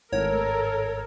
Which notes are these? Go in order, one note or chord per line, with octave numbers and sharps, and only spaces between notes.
G#1 A2 A4 A#4 C#5